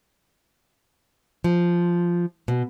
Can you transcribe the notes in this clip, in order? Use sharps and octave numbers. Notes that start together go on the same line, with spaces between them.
F3
B2